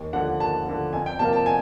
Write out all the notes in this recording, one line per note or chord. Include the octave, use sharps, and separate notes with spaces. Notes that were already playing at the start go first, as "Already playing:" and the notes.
Already playing: D#2
D3 F3 F#5
D#2 A5
D3 F3
F2 G#5
G5
C3 F3 A#3 A5
A5
G#5